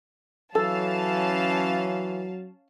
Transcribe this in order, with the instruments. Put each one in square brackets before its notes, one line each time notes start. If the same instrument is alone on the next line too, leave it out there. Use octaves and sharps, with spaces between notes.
[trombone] E3 [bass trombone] F#3 [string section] C#4 F5 A5 [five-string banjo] A4